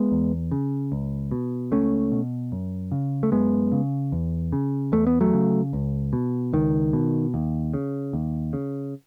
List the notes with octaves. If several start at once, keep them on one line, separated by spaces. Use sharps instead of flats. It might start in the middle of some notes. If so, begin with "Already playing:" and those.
Already playing: G#3 B3
E2
C#3
C#2
B2
C#2 A3 C#4
B2
F#2
C#3
A3
F#2 G#3 B3
C#3
E2
C#3
E2 A3
B3
F#3 A3
C#3
C#2
B2
C#2 D#3
B2
D#2
C#3
D#2
C#3